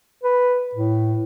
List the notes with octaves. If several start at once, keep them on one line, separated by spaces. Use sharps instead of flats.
B4
A2